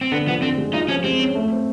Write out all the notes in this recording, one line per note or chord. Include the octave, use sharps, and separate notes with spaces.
C4
D3 B3
F3 B3
D3 C4
G#3
D#4 F4
F3 C#4
G#3 C4
C#4
A3
C4